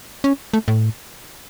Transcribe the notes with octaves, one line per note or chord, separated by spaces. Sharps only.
C#4
A3
A2